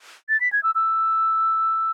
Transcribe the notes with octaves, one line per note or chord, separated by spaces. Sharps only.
A6
B6
G#6
E6
E6